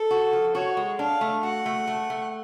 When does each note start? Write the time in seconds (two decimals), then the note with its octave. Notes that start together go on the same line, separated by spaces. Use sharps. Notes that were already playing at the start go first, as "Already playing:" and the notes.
Already playing: A4
0.11 F#4
0.33 F3
0.55 F#4 C#5
0.77 G#3
0.99 D4 F5
1.21 A3
1.43 F#4 F#5
1.66 A3
1.87 A3
2.10 A3